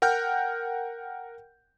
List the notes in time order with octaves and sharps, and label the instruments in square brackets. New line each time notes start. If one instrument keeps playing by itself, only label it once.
[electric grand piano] A#4 F#5 G5 F6 G6